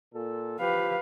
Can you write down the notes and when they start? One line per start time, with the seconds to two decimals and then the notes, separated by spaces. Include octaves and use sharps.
0.14 A#2 A4
0.59 F3 G4 B4 F5